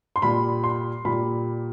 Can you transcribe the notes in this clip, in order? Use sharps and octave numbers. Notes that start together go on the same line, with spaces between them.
C6
A#2 G3 B5
C6
A#2 G3 B5